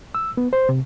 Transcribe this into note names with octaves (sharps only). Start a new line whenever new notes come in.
E6
B3
C5
C3